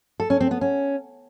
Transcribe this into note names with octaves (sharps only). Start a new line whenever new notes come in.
A4
C#4
C4
B3
C#4